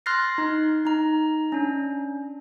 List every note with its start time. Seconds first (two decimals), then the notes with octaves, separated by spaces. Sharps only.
0.06 C6 F6 F#6 A6 A#6 C7
0.38 D#4
0.85 D#4 A#5
1.52 C#4 D4